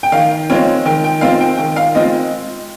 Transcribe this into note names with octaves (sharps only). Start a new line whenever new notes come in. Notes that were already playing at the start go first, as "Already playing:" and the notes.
G5
D#3 F5
G#3 C4 F4 C#5
D#3 G5
G5
G#3 C4 F4 F5
G5
D#3 G5
F5
G#3 C4 F4 D#5